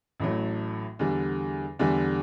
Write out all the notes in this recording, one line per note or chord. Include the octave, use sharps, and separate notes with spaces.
A1 A2 F#3 A3
E2 D3 G3
E2 D3 G3